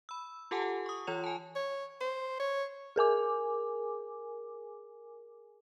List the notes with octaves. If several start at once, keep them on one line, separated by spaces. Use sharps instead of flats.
B5 E6
F4 G4 A4 F#5 G#5 A5
C#6 D#6
E3 F4 C#5 F7
G#5 A5
C#5
C5
C#5
G#4 A#4 G#5 D6